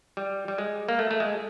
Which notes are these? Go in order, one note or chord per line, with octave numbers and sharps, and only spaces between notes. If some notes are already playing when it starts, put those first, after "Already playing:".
G3
G3
G#3
A#3
A3
A3
G#3